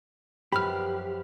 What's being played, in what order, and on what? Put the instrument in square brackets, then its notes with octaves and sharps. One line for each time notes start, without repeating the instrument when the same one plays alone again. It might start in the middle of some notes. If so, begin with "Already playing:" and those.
[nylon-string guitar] F#2 F3 B4 [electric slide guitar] G4 [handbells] B5 F6